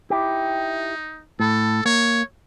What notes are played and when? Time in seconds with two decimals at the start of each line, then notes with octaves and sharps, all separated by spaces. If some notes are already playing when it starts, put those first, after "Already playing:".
0.10 D#4 E4 G4
1.40 A2 A4
1.85 A#3 C#5